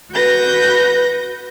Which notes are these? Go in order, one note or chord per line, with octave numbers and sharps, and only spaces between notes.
F#4 B4 G6 A#6